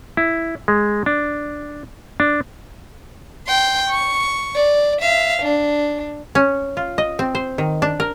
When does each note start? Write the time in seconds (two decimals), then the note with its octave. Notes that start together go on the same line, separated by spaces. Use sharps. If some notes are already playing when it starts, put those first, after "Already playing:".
0.17 E4
0.68 G#3
1.06 D4
2.20 D4
3.47 G5 C6
3.90 C#6
4.55 D5
5.01 E5 F5
5.43 D4
6.35 C#4
6.77 F4
6.98 D#5
7.19 C4
7.35 C5
7.58 D#3
7.82 D4
8.00 A#4